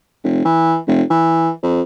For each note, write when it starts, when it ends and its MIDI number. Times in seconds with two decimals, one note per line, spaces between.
0.24 0.41 29
0.45 0.78 52
0.87 1.02 29
1.10 1.51 52
1.63 1.81 41